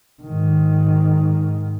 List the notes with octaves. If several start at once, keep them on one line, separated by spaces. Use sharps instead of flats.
G#2 D#3